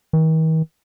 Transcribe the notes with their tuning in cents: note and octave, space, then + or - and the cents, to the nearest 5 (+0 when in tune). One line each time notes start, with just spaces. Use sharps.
D#3 +45